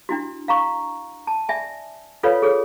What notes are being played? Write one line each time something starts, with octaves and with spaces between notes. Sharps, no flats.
D4 E4 F#4
F5 A#5 C#6
A5
D5 E5 G#5
F4 A4 B4 C#5 D5 F5
G#4 A4 C#5